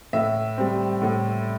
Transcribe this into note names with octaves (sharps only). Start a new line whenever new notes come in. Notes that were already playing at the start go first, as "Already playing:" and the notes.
A2 E5
G3 C4
A2